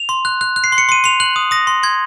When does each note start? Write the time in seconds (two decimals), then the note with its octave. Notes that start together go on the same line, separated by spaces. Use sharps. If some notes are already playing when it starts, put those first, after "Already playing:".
Already playing: F7
0.09 C6
0.25 F#6
0.41 F#6
0.56 F#6
0.64 C7
0.72 C6
0.78 C#7
0.89 C6 D#7
1.04 C6 F7
1.20 F#6 F#7
1.36 D#6
1.51 D#6 A#6
1.67 C6
1.83 C6 G#6